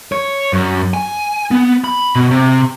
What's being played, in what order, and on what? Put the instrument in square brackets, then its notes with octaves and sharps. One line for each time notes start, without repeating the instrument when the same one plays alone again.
[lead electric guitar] C#5
F#2
G#5
B3
B5
B2
C3